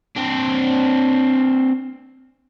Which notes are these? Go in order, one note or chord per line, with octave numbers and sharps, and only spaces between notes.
C4 D4